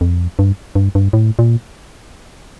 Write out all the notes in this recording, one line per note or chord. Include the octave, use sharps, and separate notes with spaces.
F2
G2
G2
G2
A2
A#2